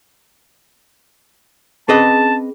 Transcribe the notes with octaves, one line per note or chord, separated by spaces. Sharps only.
C4 C#4 G#4 B4 D#5 A5